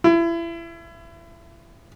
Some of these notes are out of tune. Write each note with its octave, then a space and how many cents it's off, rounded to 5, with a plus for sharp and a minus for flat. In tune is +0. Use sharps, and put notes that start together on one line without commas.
E4 +30